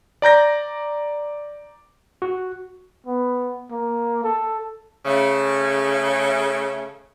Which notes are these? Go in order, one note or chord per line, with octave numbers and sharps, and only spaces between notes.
D5 A#5 G6 A#6
F#4
B3
A#3
A4
C#3 A3